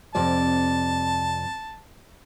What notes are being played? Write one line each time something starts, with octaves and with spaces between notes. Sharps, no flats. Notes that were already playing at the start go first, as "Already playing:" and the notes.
F2 C3 D5 A5